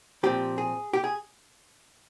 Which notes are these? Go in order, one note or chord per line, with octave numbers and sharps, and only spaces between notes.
A#2 F3 C4 G4
G#4
G4
G#4